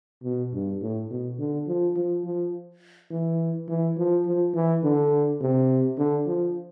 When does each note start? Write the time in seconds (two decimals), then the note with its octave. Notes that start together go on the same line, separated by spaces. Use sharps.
0.24 B2
0.53 G2
0.81 A2
1.10 B2
1.39 D3
1.67 F3
1.96 F3
2.25 F3
3.11 E3
3.69 E3
3.97 F3
4.26 F3
4.54 E3
4.84 D3
5.41 C3
5.98 D3
6.27 F3